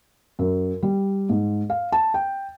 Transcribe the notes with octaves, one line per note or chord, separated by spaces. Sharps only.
F#2
G3
G#2
F5
A5
G5